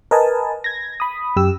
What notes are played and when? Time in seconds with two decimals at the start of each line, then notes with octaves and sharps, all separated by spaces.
0.11 A#4 B4 D#5 G#5 A5
0.64 G#6 A#6
1.00 B5 D#6
1.36 F#2 G4 E6